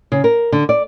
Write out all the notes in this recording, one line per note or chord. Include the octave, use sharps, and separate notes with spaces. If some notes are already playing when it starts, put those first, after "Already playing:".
C#3
A#4
D3
D5